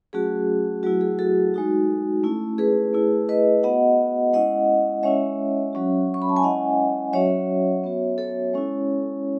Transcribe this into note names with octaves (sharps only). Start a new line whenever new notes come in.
F#3 A3 C#4 F#4 G#4
F#3 A3 E4 F#4
G#4
F#4 A4
G#3 D#4 F#4
A3 C#4 E4
G#4 B4
A3 E4
B4 D#5
B3 F#4 D#5 F#5
G#3 C#4 E4 D#5 F#5
G#3 C#4 E4 C#5 E5
F#3 C#4 F#4
C#6
B5
A5
G#5
G#3 C#4 E4 D#5 F#5
F#3 C#4 F#4 C#5 E5
B3 F#4
A4 C#5
G#3 C#4 E4